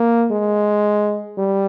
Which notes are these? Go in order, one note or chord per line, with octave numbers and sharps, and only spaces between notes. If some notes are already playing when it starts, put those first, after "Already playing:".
Already playing: A#3
G#3
G3